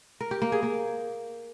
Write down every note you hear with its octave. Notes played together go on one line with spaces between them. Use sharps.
A#4
G4
A#3
G#4
A#3